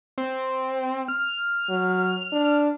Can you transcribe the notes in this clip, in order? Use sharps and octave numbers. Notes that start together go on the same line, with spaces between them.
C4
F6
F#3
D4